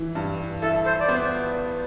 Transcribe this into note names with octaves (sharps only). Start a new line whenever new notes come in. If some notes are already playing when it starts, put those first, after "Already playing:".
Already playing: E3
G2
E4 A4
C5
D5
B3 C5